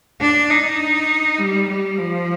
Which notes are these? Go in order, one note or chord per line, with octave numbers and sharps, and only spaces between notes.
D4
D#4
G3
G3
F3